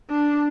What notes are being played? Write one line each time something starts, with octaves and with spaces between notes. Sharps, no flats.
D4